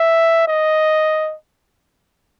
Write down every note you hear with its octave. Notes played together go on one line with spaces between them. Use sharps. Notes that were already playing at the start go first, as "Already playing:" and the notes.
Already playing: E5
D#5